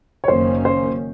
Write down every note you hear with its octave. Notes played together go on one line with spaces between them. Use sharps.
C#5
F#1 F#2 D#3 A#3 C#4 C5
C5